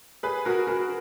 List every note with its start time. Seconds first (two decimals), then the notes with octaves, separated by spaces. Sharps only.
0.23 G#4 B4
0.45 F#4 A#4
0.67 F#4 A#4